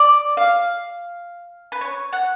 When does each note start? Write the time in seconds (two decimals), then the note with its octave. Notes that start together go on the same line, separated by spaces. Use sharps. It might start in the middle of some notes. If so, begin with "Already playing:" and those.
Already playing: D5
0.37 F5
1.72 B4
1.81 C#5
2.13 F#5